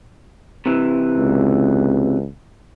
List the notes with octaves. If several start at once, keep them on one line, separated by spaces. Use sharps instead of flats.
C3 E3
C#2